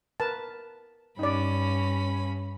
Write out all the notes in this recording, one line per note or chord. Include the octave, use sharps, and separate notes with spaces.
A#4 B4 A5
G2 C#4 D#4 D5 B5